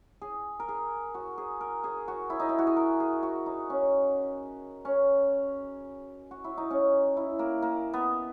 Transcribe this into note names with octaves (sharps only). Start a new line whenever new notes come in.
G#4
A#4
G#4
F#4
G#4
A#4
G#4
F#4
E4
D#4
E4
F#4
G#4
A#4
G#4
F#4
D#4
C#4
C#4
F#4
E4
D#4
C#4
E4
A#3
A#3
B3